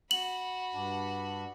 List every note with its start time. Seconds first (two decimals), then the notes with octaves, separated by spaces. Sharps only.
0.11 F#4 B5 F#7
0.73 G2 D4